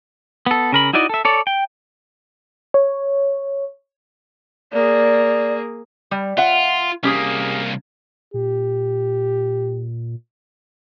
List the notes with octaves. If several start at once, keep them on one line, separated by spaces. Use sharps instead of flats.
B3 A4
C#3 A#4 B5
D#4 E4 F#4 D5 D#5
A4 E5
A4 C#5 D5
G5
C#5
A#3 G#4 D5
G3
F4 E5 F#5
C2 A#3 C#4 G4 G#4
A#2 G4